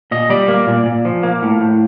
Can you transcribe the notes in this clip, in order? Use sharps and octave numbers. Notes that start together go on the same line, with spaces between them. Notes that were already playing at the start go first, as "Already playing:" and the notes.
A#2 D#5
G3 D5
A#3
A#2
A#2
F3
A#3
A2
A2